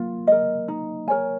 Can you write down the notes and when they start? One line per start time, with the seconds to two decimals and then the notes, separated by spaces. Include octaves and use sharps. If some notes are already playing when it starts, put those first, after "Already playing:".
Already playing: F#3 A#3 F4
0.27 A#4 D#5
0.68 D#4
1.08 A#4 C#5 G#5